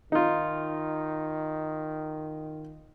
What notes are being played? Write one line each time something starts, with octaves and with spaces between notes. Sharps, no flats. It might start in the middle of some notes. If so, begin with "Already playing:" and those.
D#3 D#4 F4